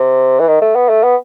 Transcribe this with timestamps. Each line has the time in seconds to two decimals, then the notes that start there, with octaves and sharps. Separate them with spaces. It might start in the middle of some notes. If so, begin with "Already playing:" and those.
Already playing: C3
0.40 E3
0.48 D#3
0.61 A3
0.76 B3
0.89 A3
1.03 B3